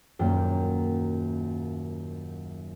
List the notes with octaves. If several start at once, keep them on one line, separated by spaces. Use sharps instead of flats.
D#1 F#2 A#3 G5